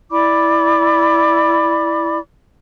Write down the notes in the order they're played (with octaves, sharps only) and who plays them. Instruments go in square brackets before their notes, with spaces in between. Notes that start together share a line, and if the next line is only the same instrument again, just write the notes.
[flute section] E4 D5 B5 D6